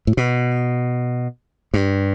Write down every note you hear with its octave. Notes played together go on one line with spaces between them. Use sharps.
A2
B2
G2